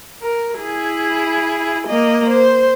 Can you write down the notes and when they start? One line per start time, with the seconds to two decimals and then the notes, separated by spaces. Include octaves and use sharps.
0.22 A#4
0.59 E4 G#4
1.87 A#3 D#5
2.30 C5